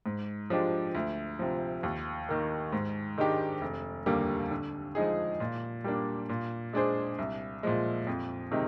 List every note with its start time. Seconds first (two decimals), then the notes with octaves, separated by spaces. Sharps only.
0.06 G#2
0.50 F3 G#3 D4 G4
0.95 D2
1.39 C3 F3
1.83 D#2
2.29 D#3 A#3
2.73 G#2
3.18 D#3 G#3 D4 G4
3.61 F1
4.06 D#2 D3 G3 A#3
4.51 D3
4.95 F3 G#3 D#4 G#4
5.40 A#2
5.84 G3 A#3 D4
6.29 A#2
6.73 G#3 D4 G#4 C5
7.18 C2
7.63 A#2 F3 G#3
8.07 F2
8.52 C3 D#3 G#3